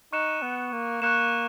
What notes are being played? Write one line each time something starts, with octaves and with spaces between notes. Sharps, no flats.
D#4 C#6 F#6 C#7 E7
B3
A#3
A#3 C#6 F#6 C#7 E7